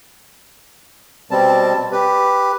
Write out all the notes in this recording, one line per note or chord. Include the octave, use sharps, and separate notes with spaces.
B2 G3 C4 A5
G4 B4